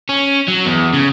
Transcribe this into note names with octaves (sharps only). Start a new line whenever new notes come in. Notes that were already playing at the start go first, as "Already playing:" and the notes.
C#4
F#3
E2
C#3